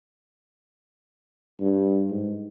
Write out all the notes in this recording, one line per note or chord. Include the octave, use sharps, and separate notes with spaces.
G2
G#2